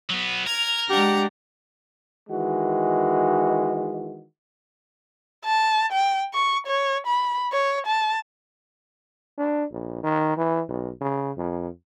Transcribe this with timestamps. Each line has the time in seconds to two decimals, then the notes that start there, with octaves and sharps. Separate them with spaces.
0.10 F#3 B3
0.46 A#4 G#6 F7
0.90 G#3 D4 G4 F#5 A#5
2.29 D#3 E3 G#3 F#4
5.45 A5
5.92 G5
6.34 C#6
6.67 C#5
7.07 B5
7.52 C#5
7.86 A5
9.38 D4
9.72 A#1
10.03 D#3
10.37 E3
10.69 B1
11.01 C#3
11.37 F2